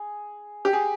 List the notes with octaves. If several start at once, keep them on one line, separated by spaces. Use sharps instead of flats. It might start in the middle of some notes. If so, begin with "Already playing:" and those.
Already playing: G#4
G4
G#4